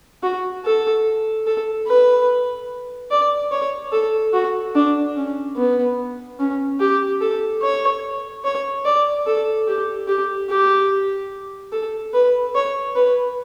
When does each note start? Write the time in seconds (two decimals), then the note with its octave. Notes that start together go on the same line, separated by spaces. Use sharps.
0.23 F#4
0.65 A4
1.47 A4
1.87 B4
3.11 D5
3.51 C#5
3.92 A4
4.33 F#4
4.75 D4
5.16 C#4
5.56 B3
6.39 C#4
6.80 G4
7.21 A4
7.62 C#5
8.44 C#5
8.85 D5
9.26 A4
9.67 G4
10.08 G4
10.49 G4
11.72 A4
12.14 B4
12.55 C#5
12.96 B4